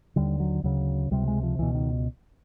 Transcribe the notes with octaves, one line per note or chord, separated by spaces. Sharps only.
D#2 D3 G3
F#3
D2 C#3 F#3
C#2 C3 G3
G#3
F3
C#2 B2 E3
D#3